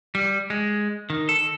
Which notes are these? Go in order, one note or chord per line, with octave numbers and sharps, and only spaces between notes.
G3
G#3
D#3
A4